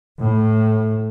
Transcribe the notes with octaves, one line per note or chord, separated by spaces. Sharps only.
A2